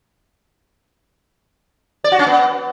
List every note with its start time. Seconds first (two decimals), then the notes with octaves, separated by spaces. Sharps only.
2.04 D5
2.12 F#4
2.19 C#4
2.27 B3